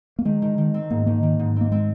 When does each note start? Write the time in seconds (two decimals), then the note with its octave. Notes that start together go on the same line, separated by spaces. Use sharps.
0.19 A#3
0.25 D#3 G#3
0.42 D#3
0.58 D#3
0.74 C4
0.90 G#2 A#3
1.06 D#3 A#3
1.23 D#3
1.39 G#2
1.56 A#3 C4
1.71 G#3 C4